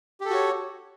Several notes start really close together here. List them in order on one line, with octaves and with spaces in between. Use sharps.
G4 A4 F#4 C#5